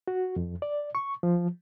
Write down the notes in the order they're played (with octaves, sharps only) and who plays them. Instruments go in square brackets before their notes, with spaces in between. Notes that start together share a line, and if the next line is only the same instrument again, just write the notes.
[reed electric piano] F#4
F2
D5
C#6
F3